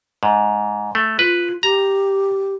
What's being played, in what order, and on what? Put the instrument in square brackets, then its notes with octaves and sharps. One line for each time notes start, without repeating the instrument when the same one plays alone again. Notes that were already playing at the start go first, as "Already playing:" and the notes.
[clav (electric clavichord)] G#2
A3
[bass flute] F4 [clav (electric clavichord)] B4
[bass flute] G4 [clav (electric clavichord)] A#5